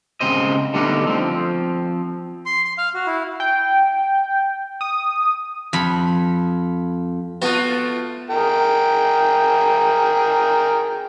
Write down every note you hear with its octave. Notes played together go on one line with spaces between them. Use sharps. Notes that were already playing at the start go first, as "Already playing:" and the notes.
C#2 C#3 C4 C5 D#5
D3 G3 A3 B3 D4 D#4
F3 C4
C6
C6
F5
F#4
E4
G5
D#6
F2 B5
A3 B3 F4 F#4
G#4 A#4 G5